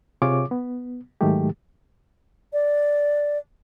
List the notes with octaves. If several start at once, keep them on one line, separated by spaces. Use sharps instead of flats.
C3 F4 G#4 C#5 D6
B3
G#2 D#3 F#3 G#3 A3 G4
D5